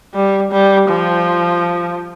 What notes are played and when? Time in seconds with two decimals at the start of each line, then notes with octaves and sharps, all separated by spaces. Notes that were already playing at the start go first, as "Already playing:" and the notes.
0.14 G3
0.51 G3
0.89 F3